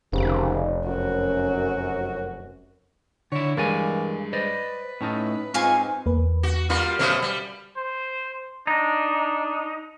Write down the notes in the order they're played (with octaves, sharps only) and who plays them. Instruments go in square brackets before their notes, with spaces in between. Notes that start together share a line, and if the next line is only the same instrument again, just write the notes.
[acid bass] F1 [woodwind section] D#2 G#2 C#3
[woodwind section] F#2 [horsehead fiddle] F#4
[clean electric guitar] D3 E4 [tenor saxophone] C#5
[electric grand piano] G2 G#3 [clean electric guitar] E3 D5 G#5 [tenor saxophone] A#3
[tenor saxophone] B4 [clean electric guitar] C5 D5 D#5
[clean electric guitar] A2 A3 D#4 [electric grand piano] C#4 A5 F6
[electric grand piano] G#2 C4 D#4 [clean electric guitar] F4 [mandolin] F5 G#5 C#6
[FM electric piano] E2 A#3 B4
[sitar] F#4
G3 F4 A#4
[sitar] F#2 B2 A3 [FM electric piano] C5
[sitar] G3
[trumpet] C5
[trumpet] D4 [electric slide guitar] D#4